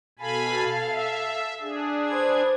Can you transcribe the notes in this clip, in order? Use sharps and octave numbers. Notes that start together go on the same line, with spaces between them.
B2 A4 F5 G#5 B5
E5
D4 G#4
B4 C5 G#6